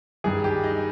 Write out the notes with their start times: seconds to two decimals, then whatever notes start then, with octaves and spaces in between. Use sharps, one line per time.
0.24 G2 D#3 G#4
0.44 G4
0.64 D#4